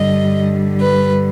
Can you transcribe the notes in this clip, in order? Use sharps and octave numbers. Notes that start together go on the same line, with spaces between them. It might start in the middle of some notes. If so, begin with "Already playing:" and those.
Already playing: G2 D3 G3 D#5
B4